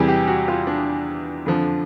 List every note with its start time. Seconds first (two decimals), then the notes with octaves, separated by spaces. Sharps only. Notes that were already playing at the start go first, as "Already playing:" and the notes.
Already playing: E2 C3 E3 G3 G#4
0.08 G4
0.27 F#4
0.48 F4
0.67 D4
1.46 F2 D3 F3